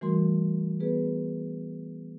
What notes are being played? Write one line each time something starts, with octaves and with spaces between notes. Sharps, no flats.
E3 G3 A3 F#4 A#4 C6
B3 G#4 B4